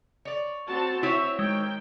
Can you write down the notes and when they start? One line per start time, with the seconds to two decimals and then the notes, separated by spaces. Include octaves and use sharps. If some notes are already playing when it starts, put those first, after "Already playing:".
0.25 C#5 D5
0.68 C4 F#4 A5
1.03 C4 E4 C#5 E5
1.39 D#3 G#3 G5